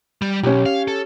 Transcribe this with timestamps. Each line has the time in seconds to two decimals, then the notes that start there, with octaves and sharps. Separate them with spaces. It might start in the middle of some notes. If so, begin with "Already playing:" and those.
0.22 G3
0.43 B1 C#4 G4
0.66 F5
0.88 A4